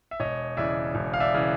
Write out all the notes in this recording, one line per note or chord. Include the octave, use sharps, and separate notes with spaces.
E5
E1 C#5 D#5
E2 C#3 E3 D5 E5
E1
F5
D5 E5
C#3 E3